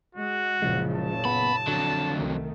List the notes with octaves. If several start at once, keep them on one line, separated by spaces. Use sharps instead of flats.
G#3 F#4
F#1 A#2 C#3 F3 G#3
A5
B3 B5
F2 D3 F#3
C2 D#3 A3